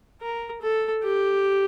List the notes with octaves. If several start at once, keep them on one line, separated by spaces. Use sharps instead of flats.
A#4
A4
G4